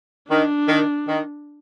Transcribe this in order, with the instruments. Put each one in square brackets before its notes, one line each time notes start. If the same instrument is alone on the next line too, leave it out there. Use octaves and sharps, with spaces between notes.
[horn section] D#3 [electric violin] D4
[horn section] D#3
D#3